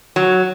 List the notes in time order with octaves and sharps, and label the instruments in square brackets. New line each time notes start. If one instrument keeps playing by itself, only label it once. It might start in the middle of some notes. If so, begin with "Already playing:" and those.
[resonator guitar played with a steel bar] F#3